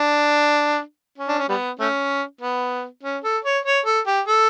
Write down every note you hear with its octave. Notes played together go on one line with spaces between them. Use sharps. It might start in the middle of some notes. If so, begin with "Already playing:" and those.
Already playing: D4
C#4
D4
C#4
G3 B3
A3 C#4
B3
C#4
A4
C#5
C#5
A4
G4
A4